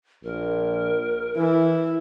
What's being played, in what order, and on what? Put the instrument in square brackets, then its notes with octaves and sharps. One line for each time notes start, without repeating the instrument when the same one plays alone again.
[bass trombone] A#1 [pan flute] A#4
[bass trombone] E3 [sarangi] E4